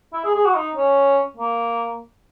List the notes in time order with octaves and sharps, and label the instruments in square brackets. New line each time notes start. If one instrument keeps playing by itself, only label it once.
[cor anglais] E4
G#4
G#4
F#4
D#4
C#4
A#3